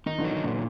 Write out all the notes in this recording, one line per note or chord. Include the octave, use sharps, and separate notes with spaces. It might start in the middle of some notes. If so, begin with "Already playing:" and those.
D#3 D#4
D3 E3
F#3
D#3
A#2 D3